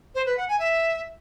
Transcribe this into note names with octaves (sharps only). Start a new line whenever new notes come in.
C5
B4
F#5
G#5
E5